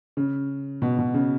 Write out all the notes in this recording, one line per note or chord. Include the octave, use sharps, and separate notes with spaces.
C#3
B2
B2
C#3